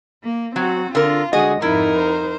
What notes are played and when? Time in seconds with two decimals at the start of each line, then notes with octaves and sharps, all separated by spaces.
0.23 A#3
0.56 F#3 C4 F#4
0.95 D3 F4 A#4
1.33 D3 G#3 F#4 G#4 D#5
1.62 F2 G#2 D#4 E4 A#4
1.96 C5